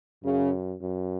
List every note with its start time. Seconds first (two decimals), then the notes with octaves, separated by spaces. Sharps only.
0.24 F#2 C#3
0.81 F#2